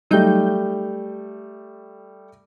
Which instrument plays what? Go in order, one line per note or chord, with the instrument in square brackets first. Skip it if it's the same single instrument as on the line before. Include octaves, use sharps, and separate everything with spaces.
[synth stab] F#3 D#4 G6 [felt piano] G3 A3